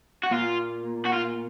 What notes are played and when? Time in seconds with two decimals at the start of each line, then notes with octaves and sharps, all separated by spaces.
0.24 F#4
0.31 A#2 F4
1.06 F#4
1.14 F4